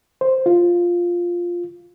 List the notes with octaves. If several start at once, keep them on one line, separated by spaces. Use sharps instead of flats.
C5
F4